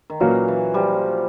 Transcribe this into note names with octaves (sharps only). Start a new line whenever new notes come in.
D#3
A#2 E3 F#3 A#3 C#4 F#4
E3
F3 G3